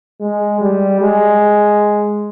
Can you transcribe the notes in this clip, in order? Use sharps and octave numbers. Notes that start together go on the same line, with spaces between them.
G#3
G3
G#3